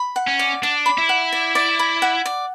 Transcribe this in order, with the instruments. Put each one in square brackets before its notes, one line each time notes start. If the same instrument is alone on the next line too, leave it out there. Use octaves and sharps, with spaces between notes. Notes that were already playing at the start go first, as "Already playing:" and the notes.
Already playing: [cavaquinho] B5
F#5
[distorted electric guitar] C#4
[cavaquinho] D5
[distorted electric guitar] D4 [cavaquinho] D5
[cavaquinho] B5
[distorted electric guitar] E4
[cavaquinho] F#5
D5
D5
B5
F#5
D5